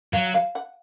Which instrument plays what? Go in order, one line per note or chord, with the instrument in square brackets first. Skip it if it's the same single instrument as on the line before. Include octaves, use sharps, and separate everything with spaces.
[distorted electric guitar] F#3 [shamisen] F5
[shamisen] F5
F#5